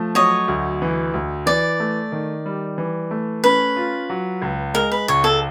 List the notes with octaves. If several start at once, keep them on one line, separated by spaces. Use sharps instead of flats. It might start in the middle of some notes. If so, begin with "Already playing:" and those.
Already playing: F3 A3
F#3 C#5 D#5
D2
E3
D2
E3 D5
A3
D#3
G3
E3
A3
C#4 B4
F4
F#3
C#2
G#3 A#4
B4
C#2 C#5
A4